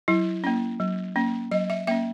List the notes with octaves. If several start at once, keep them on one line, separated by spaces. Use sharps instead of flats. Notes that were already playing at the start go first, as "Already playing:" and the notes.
F#3 E4
A#3 C#4
F#3
A#3 C#4
F#3 D#5
E5
A#3 C#4 E5